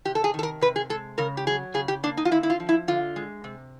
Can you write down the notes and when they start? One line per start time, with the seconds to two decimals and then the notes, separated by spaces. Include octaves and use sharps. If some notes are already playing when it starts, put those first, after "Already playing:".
0.05 C3 G4
0.15 A4
0.24 G#4
0.34 D#3 A4
0.43 A#4
0.61 C3 B4
0.76 G#4
0.90 G#3 A4
1.18 C#3 A#4
1.37 G4
1.47 F#3 G#4
1.74 C#3 G#4
1.88 G4
2.03 A#3 D4
2.17 D#4
2.25 F4
2.31 D3 E4
2.43 E4
2.50 F4
2.60 F3
2.69 E4
2.88 D3 F4
3.16 G#3
3.44 C3